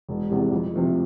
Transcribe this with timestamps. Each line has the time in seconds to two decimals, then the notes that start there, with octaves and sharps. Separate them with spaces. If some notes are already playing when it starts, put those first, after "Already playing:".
0.09 E1
0.30 E2 C3 G3
0.52 F2
0.74 C3 F3 A3